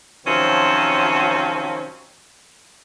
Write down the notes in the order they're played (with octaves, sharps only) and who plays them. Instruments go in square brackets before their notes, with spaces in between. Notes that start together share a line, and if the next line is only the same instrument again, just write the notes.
[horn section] C3 D#3 F3 F#3 C4 C#4